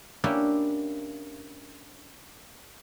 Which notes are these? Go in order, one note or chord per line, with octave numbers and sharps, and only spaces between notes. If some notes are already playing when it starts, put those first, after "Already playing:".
A#3 C#4 D4 E4 G4